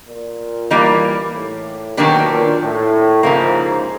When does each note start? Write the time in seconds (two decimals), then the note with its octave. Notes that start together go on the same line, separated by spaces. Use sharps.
0.08 A#2
0.71 E3 G3 A#3 D#4
1.34 A2
1.97 B2 D#3 F#3 A#3 D4 G4
2.29 A#2
2.60 A2
3.23 G#2 C#3 F3 A#3